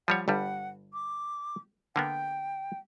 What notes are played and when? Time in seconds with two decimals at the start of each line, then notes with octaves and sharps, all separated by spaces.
0.08 F3 G3 C#5 F#5
0.28 G1 G2 G3 F#5
0.93 D6
1.96 D3 A#3 B3 G5